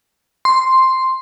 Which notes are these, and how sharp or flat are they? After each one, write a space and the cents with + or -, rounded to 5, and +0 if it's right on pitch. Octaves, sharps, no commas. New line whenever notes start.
C6 +0